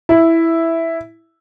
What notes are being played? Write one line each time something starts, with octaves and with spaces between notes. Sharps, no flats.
E4